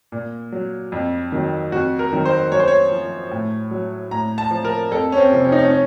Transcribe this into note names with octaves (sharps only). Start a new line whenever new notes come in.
A#2
F#3
F2
D#3 F#3
F2 F#4
A#4
D#3 F#3
C5
F#2 C#5
C5
C#5
F3
A2
F#3
A2 A#5
A5
F3
A#4
F2 A4
C#4
C4
C3 F3
C#4
D#4
C#4
C#4